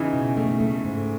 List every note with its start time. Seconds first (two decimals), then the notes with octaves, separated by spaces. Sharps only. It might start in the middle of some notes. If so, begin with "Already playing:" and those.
Already playing: C#3 E3 D#4
0.13 B2
0.37 A3
0.61 A3
0.84 G#2